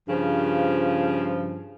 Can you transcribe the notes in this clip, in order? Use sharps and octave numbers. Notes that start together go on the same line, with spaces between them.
G2 C#3 F3